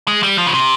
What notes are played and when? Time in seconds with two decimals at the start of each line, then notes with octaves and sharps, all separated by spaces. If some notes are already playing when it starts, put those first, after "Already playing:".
0.08 G#3
0.23 G3
0.38 F3
0.47 C#3
0.54 C3